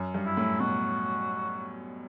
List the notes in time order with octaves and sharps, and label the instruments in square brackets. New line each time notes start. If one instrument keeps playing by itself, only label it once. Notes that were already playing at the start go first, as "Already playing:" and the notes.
Already playing: [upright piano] F#2
G2
[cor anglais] E4
[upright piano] A2
[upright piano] B2 [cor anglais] F#4